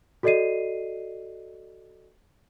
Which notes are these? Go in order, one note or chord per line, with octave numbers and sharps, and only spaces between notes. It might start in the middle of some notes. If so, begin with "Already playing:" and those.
F#4 A4 D5 D#5 C7 D#7